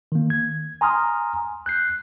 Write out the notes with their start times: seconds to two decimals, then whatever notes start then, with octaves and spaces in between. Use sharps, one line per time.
0.12 D#3 A#3
0.30 G#6
0.81 G#5 A#5 C6 D#6 F6
1.66 F#6 G6 C7